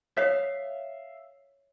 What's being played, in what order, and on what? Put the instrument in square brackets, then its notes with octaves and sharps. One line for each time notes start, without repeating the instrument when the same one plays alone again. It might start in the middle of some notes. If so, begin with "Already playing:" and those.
[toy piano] C#5 D#6 [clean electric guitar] E5 F5